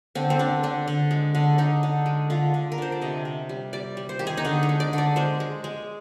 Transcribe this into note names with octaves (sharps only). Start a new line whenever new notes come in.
D3 C4
C4
D3 D4
D3 D4
D3
G#3
D3
D3 D#4
D3
G#3
D3 F4
D3
A#4
D3 C5
D5
C3 D#5
C3
G3
G3 D5
G3
C5
D#3 G4
G#4
D#4
D3 D4
D#4
G#3
D5
D3 D5
G#3 C5
G#3
G#3